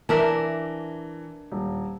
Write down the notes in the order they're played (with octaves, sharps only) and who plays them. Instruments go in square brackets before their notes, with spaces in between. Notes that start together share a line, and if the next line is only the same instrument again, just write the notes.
[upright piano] E3 [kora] D4 A#4 E5
[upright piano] D#1